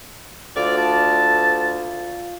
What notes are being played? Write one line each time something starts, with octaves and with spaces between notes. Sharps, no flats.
D2 F4 D5 F5
A5